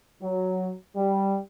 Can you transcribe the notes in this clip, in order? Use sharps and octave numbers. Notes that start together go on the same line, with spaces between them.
F#3
G3